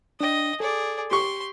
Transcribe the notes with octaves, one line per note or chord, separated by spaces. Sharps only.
D4 D#5 G5
G#4 A4 D5
G4 C6 C#6